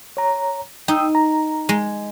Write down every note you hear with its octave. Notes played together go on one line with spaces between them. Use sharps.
C#5 A#5
D#4 G5 D#6 E6
A#5
G#3